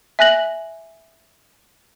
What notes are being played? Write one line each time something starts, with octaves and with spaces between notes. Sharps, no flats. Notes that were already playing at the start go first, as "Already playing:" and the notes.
E5 G#5 F#6 A#6 F#7